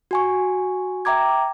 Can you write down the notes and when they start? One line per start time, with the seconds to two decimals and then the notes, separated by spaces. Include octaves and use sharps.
0.11 F#4 G#5 C#6
1.05 E5 G5 A#5 D6 G#6